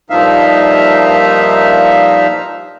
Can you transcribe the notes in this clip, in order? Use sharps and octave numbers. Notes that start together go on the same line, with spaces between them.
G2 A#2 F3 D#4 E5 F5